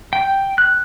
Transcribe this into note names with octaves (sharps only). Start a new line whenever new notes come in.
G5
F#6